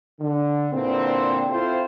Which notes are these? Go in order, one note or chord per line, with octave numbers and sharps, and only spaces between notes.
D3
A#2 D3 E3 C4
C4 E4 F4 A4 C5